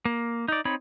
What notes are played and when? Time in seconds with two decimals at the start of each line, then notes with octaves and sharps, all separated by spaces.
0.05 A#3
0.48 D#4 D5
0.65 C4 D#4 C#5 B5